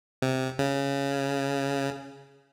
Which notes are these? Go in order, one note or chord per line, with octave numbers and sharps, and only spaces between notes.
C3
C#3